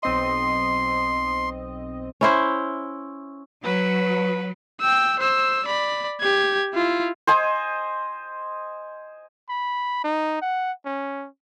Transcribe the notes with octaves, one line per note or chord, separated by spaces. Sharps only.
B1 C4 D#5 C6
C#4 E4 C5
F#3 B4
G5 E6
C5 E6
D5 B5
G4 G#6
E4 F4
C5 D#5 G#5
B5
D#4
F#5
C#4